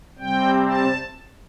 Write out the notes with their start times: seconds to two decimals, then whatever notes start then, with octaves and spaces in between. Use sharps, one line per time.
0.18 C3 G3 C4 G5
0.65 A5